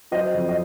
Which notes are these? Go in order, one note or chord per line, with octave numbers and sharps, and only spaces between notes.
F#3 C5 D#5
F2
D#5